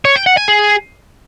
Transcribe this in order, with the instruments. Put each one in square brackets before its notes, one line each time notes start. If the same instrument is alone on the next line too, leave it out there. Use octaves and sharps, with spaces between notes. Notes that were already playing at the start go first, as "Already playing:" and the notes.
[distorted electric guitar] C#5
G5
F#5
G#5
G#4